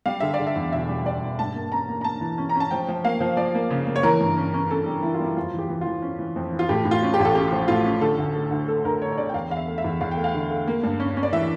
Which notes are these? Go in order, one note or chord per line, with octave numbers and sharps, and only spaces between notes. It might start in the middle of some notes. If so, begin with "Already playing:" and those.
G3 F5
D3 E5
D5
D3
E5
E2
E1 E5
G3
G3 D5
E1
G2 A5
A#3
C#4 A#5
A#3
A#5
A#3 A5
E3
C#4
A#5
C#4
A5
F3 G5
F3
A#3 F5
F3
F3 D5
A#3
C#3
A#3
C#5
E3 A#4
G2
C#4
C#4
C#4 A4
G3
E3 E4
F4
G3 E4
F2 F4
E3
G4
E3
F4
E3
C#4
E3
F2
E3
F4
A2 G4
A2
F4
C#4
G4
A1
A4
C#4 G4
F3
A2 F4
C#4
D3 A4
D2
A3
D2
A3 A4
D2 A#4
A3 C#5
C#5
D3 D5
G5
E2 F5
E2 F5
E5
A3
E5
E2
E2 F5
G5
A3
F5
D3
A3
A#3
G2
C#4
C#4
D5
E3 E5